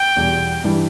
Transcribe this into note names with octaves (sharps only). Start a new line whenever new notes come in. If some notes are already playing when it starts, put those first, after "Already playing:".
Already playing: G5
E2 B2 G3
G2 E3 G3